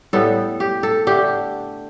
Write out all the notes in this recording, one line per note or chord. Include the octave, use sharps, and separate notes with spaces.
A2 G3 B3 A4
G4
A4
D3 A3 D4 G4